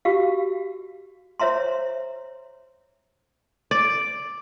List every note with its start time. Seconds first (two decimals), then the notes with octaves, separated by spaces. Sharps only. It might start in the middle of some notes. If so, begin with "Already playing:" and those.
0.05 F#4 G4 F5
1.40 C5 C#5 E5 A#5 C6
3.71 D5